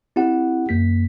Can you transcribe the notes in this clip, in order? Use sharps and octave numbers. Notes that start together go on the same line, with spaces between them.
C4 E4 G4 F#5
F#2 A#3 B6